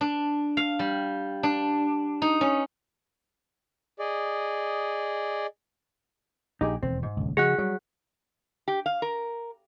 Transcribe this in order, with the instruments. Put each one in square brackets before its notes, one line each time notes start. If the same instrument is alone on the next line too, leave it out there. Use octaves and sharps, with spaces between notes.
[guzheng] D4
F5
G3
D4
D#4
C#4
[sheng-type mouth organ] G#4 D5 D#5
[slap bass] A#1 [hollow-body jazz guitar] D#4 G4 G#4
[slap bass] E1 D#2 [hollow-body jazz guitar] C4
[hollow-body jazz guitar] G#2
[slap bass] D#1 C#2
[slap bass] C#3 F3 [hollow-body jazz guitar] G#3 F#4 [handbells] G#4 F#5 F#6
[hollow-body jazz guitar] F#3 [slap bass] G3
[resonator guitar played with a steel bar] G4
F5
A#4